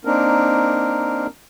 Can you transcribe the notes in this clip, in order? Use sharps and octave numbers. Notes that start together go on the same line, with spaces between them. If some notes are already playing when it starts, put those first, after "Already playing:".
A#3 C4 D4 D#4 A#4